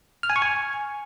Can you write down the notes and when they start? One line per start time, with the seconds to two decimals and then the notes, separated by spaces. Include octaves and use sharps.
0.23 F6
0.30 G#5
0.36 C#6
0.42 G#5